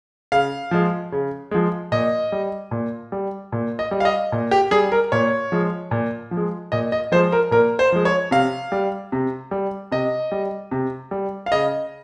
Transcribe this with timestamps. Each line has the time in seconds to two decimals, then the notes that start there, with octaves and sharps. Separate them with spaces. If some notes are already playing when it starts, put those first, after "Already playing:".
0.32 C#3 F5
0.71 F3 G#3
1.12 C#3
1.51 F3 G#3
1.92 A#2 D#5
2.32 G3
2.71 A#2
3.12 G3
3.52 A#2
3.79 D#5
3.91 G3
4.00 F5
4.05 D#5
4.32 A#2
4.51 G4
4.71 G3 G#4
4.92 A#4
5.12 A#2 C#5
5.52 F3 G#3
5.91 A#2
6.31 F3
6.37 G#3
6.72 A#2 D#5
6.92 D#5
7.12 F3 G#3 C5
7.32 A#4
7.51 A#2 A#4
7.79 C5
7.92 F3 G#3
8.05 C#5
8.31 C3 F5
8.72 G3
9.12 C3
9.51 G3
9.92 C3 D#5
10.32 G3
10.71 C3
11.11 G3
11.46 F5
11.52 C#3 D#5